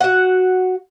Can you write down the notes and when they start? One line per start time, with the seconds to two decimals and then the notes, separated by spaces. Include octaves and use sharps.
0.01 F#4 F#5